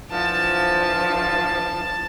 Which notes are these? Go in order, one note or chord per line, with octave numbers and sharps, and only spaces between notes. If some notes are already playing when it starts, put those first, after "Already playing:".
D3 E3 F3 A5